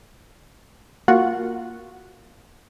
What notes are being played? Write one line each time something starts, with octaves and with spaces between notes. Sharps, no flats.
A#3 F4 F#4 F#5